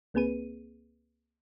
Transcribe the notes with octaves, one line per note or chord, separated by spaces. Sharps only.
C#2 A#3 C4 G#4 B4 D#7